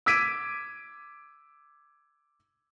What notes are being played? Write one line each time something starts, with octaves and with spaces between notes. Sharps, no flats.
D6 E6 G#6 B6 D7 D#7